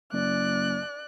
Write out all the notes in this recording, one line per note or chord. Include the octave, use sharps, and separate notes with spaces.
F#1 D5 F#6